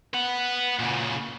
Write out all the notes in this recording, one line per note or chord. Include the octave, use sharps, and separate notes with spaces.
B4 F#5
A#2 C#3